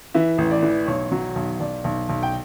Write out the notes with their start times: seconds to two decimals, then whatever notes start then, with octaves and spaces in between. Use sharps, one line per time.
0.14 E3 E5
0.38 A1
0.51 D5
0.63 E3
0.87 B1 C#5
1.12 F#3
1.36 B1
1.60 B1 D5
1.84 B1
2.09 B1
2.23 G5